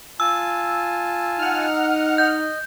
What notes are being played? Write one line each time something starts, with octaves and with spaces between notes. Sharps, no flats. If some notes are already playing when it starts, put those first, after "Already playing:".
F4 G#5 A5 E6
D#4 F#5 F6
D#5 G6